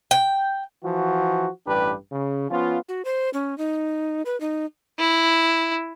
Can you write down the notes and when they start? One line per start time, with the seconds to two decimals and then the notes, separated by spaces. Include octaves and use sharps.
0.11 G5
0.84 E3 F3 F#4
1.66 A1 G2 D4 G4 B4
2.12 C#3
2.50 F3 B3 C#4 F4
2.89 F#4
3.05 C5
3.34 C#4
3.58 D#4
4.26 B4
4.40 D#4
4.99 E4